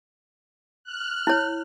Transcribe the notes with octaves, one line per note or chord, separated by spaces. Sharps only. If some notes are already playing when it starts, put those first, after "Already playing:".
F6 F#6
E4 C#5